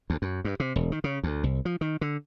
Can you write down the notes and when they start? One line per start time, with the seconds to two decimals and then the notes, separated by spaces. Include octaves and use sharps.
0.10 D2
0.22 F#2
0.45 G2
0.60 C3
0.76 E1
0.92 D#3
1.04 C#3
1.23 D2
1.43 C2
1.65 F3
1.81 D#3
2.01 D3